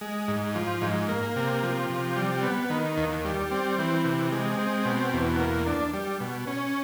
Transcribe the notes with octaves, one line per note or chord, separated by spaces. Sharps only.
G#3
G#2
F3
G#2
A#3
C3
F3
C3
G3
B3
D#3
D#2
G3
C4
E3
C3
G#3
C4
B2
E2
A#3
D4
G3
B2
C#4